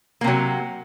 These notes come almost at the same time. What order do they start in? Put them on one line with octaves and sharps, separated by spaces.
A#3 C3 F#3